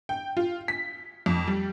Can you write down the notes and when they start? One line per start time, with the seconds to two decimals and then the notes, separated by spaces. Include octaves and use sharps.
0.09 G5
0.37 F4
0.68 B6
1.26 F2
1.47 G3